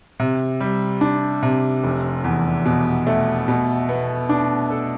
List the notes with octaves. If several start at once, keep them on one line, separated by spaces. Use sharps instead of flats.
C3
G3
D4
C3
F1
E2
B2
A3
B2
B3
D4
A4